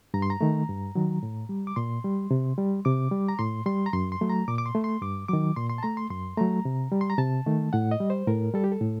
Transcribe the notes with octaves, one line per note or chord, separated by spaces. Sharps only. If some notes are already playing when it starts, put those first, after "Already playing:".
G2 A#5
C6
A#5
D#3 A3
G2
D#3 F#3
A2
G3
D6
A#2 C6
G3
C3
G3
C3 D6
G3
A#5
A2 C6
G3 C6
A#5
F#2 C6
C6
F#3 A3
A#5
A#2 D6
D6
C6
A3
C6
G2 D6
D#3 F#3 D6
A#2 C6
C6
A5
A3 A#5
C6
F#2 C6
F#3 A3 A#5
C3
G3
C6
A#5
C3 A5
D#3 A3
A2 F#5
D#5
G3
C5
A2 A#4
G3 A4
G4
A4
A2